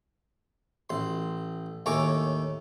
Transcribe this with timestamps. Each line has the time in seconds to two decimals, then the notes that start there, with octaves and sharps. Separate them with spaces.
0.90 A1 C6
1.86 D#2 A2 C#5 G#5 A#5 D6